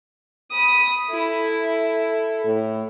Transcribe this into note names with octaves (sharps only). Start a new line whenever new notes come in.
B5 D#6
E4 A4
A2